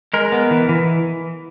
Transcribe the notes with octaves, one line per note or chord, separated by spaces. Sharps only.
G#3 A#4
B3
E3
E3